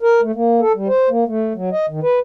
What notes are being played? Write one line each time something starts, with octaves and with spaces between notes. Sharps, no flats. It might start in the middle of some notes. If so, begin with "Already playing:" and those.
A#4
A3
A#3
A4
G3
C5
A#3
A3
F#3
D#5
D#3
B4